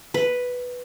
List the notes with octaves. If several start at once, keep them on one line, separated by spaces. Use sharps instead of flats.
B4